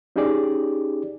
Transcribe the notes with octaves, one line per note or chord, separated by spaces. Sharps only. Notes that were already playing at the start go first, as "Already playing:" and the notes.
C#4 D#4 G4 G#4 D5